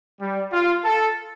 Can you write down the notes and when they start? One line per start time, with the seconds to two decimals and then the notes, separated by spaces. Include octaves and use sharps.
0.20 G3
0.52 F4
0.84 A4